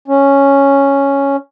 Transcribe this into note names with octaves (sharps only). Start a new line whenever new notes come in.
C#4